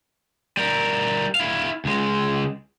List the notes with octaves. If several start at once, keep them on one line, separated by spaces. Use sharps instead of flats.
G3 A#4
E4 F5
C#2 G#3